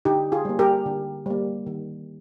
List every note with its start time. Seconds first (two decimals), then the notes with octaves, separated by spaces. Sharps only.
0.05 D3 D#4 G4
0.32 F4 G#4
0.45 G3 A#3
0.59 G4 A#4
0.86 D3
1.26 G3 A#3
1.67 D#3